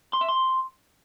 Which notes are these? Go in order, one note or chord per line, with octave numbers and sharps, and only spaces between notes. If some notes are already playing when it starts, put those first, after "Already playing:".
C6
E5
C6